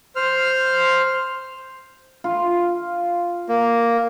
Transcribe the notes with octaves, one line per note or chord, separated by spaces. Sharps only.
C5 F6
F4
A#3